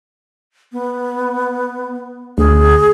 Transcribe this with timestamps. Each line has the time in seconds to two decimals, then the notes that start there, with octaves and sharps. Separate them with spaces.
0.72 B3
2.38 D2 G#4